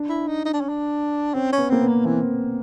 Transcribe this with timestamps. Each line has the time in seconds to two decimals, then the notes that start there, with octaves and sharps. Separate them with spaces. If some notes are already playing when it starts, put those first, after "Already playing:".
Already playing: D4
0.09 E4
0.27 D#4
0.45 D#4
0.53 D4
0.61 C#4
0.69 D4
1.34 C4 C#4
1.52 C#4
1.58 B3
1.70 A#3 C4
1.81 B3
1.88 A#3
2.05 E3 C4